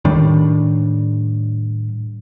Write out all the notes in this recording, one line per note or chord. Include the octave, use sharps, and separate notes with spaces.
A2 D#3 G3 D4